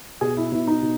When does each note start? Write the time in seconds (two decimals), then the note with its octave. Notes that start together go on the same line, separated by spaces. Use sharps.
0.21 B2 G#4
0.37 E4
0.52 B2 E4
0.67 D#4
0.82 B2